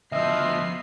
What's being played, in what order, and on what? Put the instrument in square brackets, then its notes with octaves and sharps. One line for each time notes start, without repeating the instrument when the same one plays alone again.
[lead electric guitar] D2 F3 [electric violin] B3 C7 [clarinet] D#5 [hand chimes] E5 E6